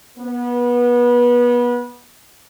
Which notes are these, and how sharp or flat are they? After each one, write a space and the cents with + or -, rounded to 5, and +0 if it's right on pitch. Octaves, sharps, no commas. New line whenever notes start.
B3 -25